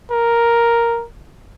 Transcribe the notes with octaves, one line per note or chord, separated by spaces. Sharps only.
A#4